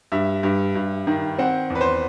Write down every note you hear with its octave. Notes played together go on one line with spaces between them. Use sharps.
G2 E5
G2
G2
D#3
C4 F#5
E2
B4
C5